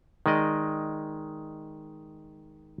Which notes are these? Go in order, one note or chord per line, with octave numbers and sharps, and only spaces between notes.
D#3 G#3 D5 D#5